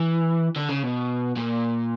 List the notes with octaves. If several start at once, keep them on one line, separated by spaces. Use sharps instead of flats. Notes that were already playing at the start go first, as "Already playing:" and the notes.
Already playing: E3
D3
C#3
B2
A#2